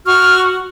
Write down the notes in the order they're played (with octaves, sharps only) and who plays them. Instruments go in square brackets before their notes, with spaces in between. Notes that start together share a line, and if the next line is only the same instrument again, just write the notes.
[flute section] F#4 C#6 F6